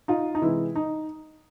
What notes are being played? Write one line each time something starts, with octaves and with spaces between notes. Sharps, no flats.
D#4 F4
D#4
C3 E3 G#3 E4
D#4